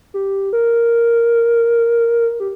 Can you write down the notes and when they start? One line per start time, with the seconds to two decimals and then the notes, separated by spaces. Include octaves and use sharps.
0.14 G4
0.53 A#4
2.40 G4